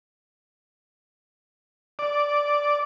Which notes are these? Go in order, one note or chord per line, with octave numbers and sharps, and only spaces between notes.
D5